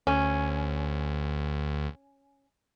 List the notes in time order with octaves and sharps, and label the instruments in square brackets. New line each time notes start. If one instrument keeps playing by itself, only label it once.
[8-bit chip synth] D2 [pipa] C#4